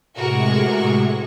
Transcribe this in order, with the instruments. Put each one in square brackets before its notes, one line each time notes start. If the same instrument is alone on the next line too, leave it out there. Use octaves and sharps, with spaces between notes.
[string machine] A2 C3 G#3 [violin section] F#4 A#4 C#6